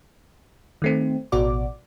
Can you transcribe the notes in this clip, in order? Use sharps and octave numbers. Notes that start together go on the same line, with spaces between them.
D#3 A3 C4
A1 B2 F#4 D5 D6